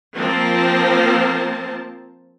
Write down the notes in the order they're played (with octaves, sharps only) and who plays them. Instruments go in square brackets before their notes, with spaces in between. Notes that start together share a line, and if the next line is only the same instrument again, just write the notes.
[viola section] F3 A#3 C4 A#4 C5 A5